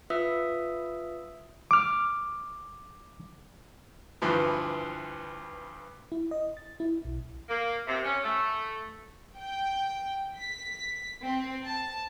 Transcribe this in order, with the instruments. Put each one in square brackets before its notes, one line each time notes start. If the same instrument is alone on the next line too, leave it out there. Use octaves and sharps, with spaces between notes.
[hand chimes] F4 B4 E5 D#6 E6 B6
[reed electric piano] D6 F6
[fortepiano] D2 G2 E3 F3
[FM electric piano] E4
D#5
A6
E4
B1
[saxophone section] A#3
C3
C#4
A3
[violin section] G5
B6
C4
A5